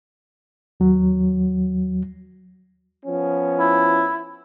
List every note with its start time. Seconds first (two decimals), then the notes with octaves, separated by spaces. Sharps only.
0.80 D#2 F#3
3.05 F3 B3 C#4
3.59 E4